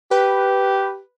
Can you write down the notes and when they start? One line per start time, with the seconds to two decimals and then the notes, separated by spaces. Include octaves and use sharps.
0.11 G4 B4